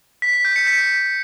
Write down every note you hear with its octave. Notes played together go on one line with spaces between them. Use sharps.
B6
B6
G6
C#7
B6